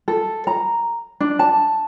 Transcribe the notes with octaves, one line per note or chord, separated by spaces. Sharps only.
A4
A#5
D4
A5